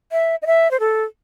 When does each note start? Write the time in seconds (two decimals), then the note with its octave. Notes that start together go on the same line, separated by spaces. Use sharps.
0.12 E5
0.42 D#5
0.46 E5
0.71 C5
0.80 A4